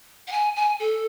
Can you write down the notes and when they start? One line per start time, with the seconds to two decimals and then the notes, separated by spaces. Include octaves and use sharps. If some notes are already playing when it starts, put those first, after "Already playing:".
0.28 F#5
0.32 G#5
0.56 G#5
0.79 A4